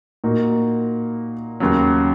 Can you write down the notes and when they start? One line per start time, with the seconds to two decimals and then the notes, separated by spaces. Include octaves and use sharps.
0.24 A#2 A#3 D#4 F#4
1.60 D#2 C#3 F#3